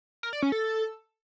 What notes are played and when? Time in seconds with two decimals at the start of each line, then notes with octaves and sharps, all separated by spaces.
0.23 A#4
0.33 D5
0.42 C#4
0.52 A4